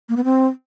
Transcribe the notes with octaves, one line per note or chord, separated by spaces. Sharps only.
A#3
B3
C4